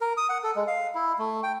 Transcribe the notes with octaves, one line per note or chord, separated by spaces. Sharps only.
A#4
D#6
F#5
A4
G#3
F5
E4
A3
G5